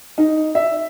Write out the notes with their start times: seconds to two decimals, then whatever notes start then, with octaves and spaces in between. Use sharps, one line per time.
0.18 D#4
0.55 E5